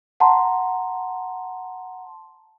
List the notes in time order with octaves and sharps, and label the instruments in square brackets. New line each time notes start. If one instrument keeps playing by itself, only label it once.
[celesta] F#5 A5 A#5 C6